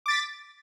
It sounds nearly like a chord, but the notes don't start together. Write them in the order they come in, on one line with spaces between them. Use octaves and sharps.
D6 A6 B6